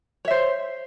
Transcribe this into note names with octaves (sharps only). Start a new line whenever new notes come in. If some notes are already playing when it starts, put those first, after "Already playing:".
C5 C#5 E5